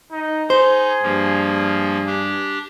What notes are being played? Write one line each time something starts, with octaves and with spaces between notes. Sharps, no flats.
D#4
D#4 G#4 C5
G2 F3 A#3
D4 G4